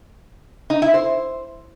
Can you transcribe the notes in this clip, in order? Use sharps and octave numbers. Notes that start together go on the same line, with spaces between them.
D#4
E4
C5